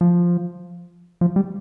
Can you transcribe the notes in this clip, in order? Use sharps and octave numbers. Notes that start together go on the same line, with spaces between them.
F3
F3
G3